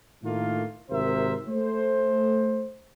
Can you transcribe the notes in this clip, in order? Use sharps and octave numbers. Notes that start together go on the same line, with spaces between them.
A2 D#3 A3 A#3 F4
G#1 C3 A#4 C5 E5
A3 C5